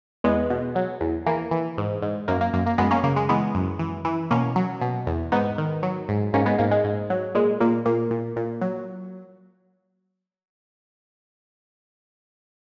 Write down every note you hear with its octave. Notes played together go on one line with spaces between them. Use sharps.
E2 G#3 B3
B2
F#3
E2
E3 A#3
E3
G#2
G#2
F#2 A#3
A#3
F#2 A#3
A#3
F#2 G#3 B3
A#3 C#4
C#3 A#3
G#3
E3 G#3 B3
F#2
E3
E3
B2 A#3 C#4
F#3
B2
E2
G#2 B3 D#4
D#3
F#3
G#2
G#2 A#3 C#4
G#3 B3
G#2 A#3
G#3
G#2
F#3
A#2 G#3
A#2 A#3
A#2 A#3
A#2
A#2
F#3